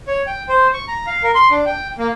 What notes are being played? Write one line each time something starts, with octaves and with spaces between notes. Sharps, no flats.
C#5
G5
C5
C#6
A#5
F5
A#4
C6
D4
G5
A#3